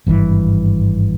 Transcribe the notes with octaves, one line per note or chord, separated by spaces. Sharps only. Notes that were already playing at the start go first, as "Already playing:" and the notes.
G#1 G2 D#3 E3